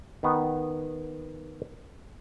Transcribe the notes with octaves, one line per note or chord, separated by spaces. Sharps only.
D#3 B3